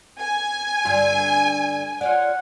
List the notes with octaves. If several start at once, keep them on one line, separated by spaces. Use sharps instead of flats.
G#5
G2 D3 F4
F4 C#5 D5 F#5